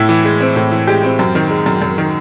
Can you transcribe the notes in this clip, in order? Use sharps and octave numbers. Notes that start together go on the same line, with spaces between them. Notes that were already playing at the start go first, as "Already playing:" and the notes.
Already playing: A2 E4 E5
E3
G#3
C4
A2
E3
G#3 G4 G5
C4
F#2
D#3
G#3
F#2
F#2
D#3